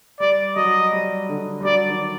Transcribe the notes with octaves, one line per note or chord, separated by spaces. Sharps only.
G3 D5
F#3 D#5
G3
D3
G3
F#3 D5
D#3